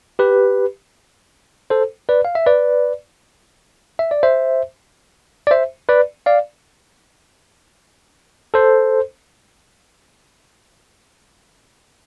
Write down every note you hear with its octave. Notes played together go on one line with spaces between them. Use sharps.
G4 B4
A4 C5
B4 D5
F5
E5
B4 D5
E5
D5
C5 E5
D5
C5 E5
B4 D5
D5 F5
A4 C5